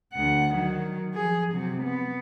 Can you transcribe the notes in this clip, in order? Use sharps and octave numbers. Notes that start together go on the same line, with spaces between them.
D2 F#5
D#3 F#3
F3 G#4
C3 F#3
B3